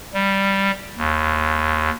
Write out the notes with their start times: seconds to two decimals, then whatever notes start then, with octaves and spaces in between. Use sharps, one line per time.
0.14 G3
0.97 D#2